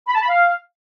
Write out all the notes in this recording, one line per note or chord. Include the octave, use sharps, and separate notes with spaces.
B5
A5
B5
F5